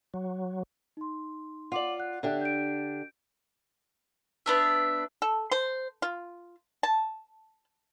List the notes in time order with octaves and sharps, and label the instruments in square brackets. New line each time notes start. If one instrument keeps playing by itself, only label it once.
[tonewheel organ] F#3
[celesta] D#4 C6
[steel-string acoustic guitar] F4 D5 [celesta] F#5 D6 F#7
[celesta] F#5 F#6
[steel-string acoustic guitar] D3 D4 G4 [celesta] E5 F#6
[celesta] G6 D7
[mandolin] B3 D4 E5
[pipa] A4
C5
F4
A5